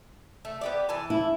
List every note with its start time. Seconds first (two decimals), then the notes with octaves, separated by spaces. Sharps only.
0.45 A3
0.61 B3 G4 D5
0.89 E3 G#5 A5
1.10 E4